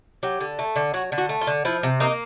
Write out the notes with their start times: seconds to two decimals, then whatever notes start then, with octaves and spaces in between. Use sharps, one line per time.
0.23 F#3 G4
0.40 D3
0.59 A3
0.76 D3
0.94 F#3 F#4
1.12 D3
1.18 F#4
1.29 A3
1.41 F4
1.47 D3
1.65 F3 E4
1.83 C3
2.00 A#3 D#4